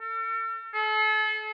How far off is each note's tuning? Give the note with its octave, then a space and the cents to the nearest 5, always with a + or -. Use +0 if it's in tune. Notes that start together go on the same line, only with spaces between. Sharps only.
A4 +45
A4 -40